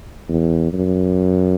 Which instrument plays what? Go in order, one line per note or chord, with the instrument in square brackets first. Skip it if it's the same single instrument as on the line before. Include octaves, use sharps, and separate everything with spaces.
[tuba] E2
F#2